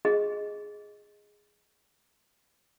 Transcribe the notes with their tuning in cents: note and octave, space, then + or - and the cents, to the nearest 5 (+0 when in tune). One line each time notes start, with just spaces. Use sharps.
G#4 +0 D#5 +0